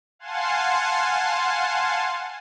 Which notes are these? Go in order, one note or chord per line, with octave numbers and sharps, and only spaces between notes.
F5 F#5 G#5 A5 C6